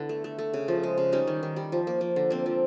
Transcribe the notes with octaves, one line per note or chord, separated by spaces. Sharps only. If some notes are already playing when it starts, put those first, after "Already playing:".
Already playing: D3 B3 D4 E4
A3
A3
A3
C#3
F3
G#3
C#3
G3 C#4 D#4
D#3
D#3
G3
F3
A#3
F3
D3
A#3 C4
F3